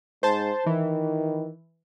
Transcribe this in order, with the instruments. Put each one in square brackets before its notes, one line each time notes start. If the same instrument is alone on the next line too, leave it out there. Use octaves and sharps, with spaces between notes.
[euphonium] G#2 [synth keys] C5 A5
[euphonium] D#3 [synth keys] E3